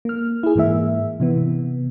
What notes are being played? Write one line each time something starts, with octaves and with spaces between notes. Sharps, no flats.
A#3 F6
E4 G#4
G#2 E3 A#3 E5
C3 E3 B3